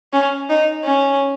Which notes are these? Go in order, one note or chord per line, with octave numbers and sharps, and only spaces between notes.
C#4
D#4
C#4